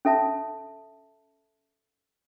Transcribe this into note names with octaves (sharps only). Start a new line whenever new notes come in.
C#4 A4 E5 A5